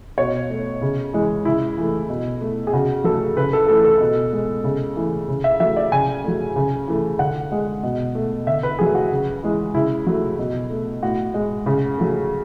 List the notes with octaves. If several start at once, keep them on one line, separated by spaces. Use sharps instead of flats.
B2 C#5
A3
C#3
E3 G#3
C#3 E4
E3 A3
B2
A3
G#4
C#3 F#4
F#3 A3 A4
C#3 B4
A4
E3 A3 A4
A4
B2
G#3
C#3
E3 A3
C#3
E5
F#3 A3 E5
D5
C#3 G#5
F#3 A3
C#3
E3 A3
D3 F#5
G#3
B2
A3
D3 E5
B4
F#3 A3 G#4
F#4
C#3
E3 G#3
C#3 E4
F#3 A3
B2
A3
A2 F#4
G#3
C#3
F#3 A3